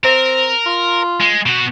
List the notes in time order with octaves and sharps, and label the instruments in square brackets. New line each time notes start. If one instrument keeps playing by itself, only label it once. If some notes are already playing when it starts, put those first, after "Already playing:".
[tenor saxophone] C4 [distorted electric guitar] A#4
[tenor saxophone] F4
[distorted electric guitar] G#3
B2 F#4